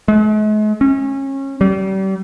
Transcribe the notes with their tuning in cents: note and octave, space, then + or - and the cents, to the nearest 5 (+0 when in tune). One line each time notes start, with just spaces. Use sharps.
G#3 +45
C#4 -25
G3 -35